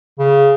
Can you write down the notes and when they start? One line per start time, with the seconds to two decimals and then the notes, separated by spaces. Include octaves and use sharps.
0.19 C#3